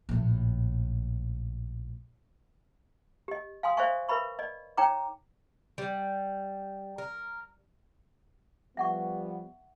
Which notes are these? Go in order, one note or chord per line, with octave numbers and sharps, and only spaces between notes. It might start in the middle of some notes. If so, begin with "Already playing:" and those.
A#1 A2
G4 D#5
F5 G#5 C6 D#6
C5 D5 E5 F5 G#5 C#6
A#4 B4 E5 B5 C#6
D5 D#5
D#4 C#5 G5 A#5 D6
G3
A#4
F3 G3 B3 E5 F#5 C#6